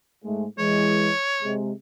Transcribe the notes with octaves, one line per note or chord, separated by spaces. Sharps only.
G#2 G#3 A3
E3 G#3 C#5
C3 G#3